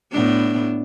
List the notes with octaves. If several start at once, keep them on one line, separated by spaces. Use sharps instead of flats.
A2 B3 D4